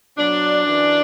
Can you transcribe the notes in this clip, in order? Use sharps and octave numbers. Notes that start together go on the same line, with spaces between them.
B2 F#3 D4
F#2 E3